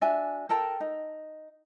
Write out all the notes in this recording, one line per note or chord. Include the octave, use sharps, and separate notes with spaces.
D4 F#4 E5 G#5
A4 A#4 G5 A5
D#4